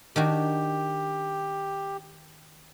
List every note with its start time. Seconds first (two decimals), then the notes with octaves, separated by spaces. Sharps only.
0.16 D#3 D4 F#4 G4